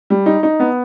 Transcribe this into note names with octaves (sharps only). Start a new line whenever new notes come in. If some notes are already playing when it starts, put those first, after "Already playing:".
G3
D#4
D#4
B3